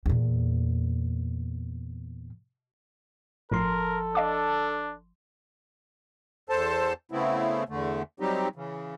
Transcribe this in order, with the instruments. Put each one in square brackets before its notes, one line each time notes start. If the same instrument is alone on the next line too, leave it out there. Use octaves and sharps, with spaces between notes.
[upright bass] E2 A#2
[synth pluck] G1 F3 C6 [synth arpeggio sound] A2 [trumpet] A4 [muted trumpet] A#4
[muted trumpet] D4 [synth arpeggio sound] D#5 F5 D6
[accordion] E2 A4 C5 A5
C#3 A3 B3 C4 E4
E2 D3 A3
F#3 G3 C4 D#4 G4
C#3 E3